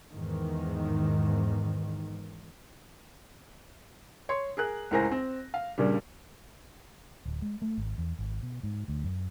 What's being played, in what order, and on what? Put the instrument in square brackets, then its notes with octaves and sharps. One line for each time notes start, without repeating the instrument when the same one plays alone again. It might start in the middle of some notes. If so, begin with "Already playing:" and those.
[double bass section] E2 G#2 D#3
[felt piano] C#5 C6
G#4 A#4 F#6
C#2 A2 A#4 C5 G#5 A#6
C4
F5
G2 A#2 C#3 G3
[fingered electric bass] D1
G#3
A3
G#1
E2
G#1
B2
G#2
D2
F#2